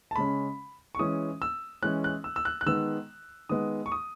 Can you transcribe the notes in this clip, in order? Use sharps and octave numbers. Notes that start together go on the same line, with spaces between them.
A5
C#3 G#3 C#4 B5
C#6
E3 G#3 C#4 D#6
E6
E3 G#3 C#4 F#6
F#6
E6
E6
F#6
F#6
D#3 G#3 B3 E6
D#3 G#3 B3 D#6
C#6
D#6